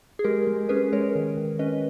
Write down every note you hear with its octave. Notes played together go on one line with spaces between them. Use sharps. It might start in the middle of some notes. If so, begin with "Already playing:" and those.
G#4
G#3 G4 A#4
G#3
C#4 G#4 B4
G#3 A#4 C#5
D#3
D#3
C#4 B4 D#5